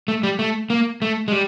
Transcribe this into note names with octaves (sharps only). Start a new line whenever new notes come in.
A3
G3
A3
A#3
A3
G#3
G3